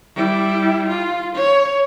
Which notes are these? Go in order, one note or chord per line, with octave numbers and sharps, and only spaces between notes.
G3 E4
F4
C#5